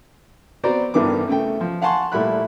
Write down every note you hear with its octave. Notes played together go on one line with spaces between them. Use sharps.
B3 C4 F#4 C5 D5 A#5
A1 G2 D#3 E3 B3 D6
C#3 A3 G5
F3
F5 F#5 G#5 A5 C6 C#6
A#2 G3 A3 E4 B5 F#6